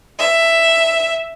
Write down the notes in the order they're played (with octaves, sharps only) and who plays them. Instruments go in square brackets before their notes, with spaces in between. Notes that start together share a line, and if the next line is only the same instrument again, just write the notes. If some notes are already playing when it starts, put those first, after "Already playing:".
[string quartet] E5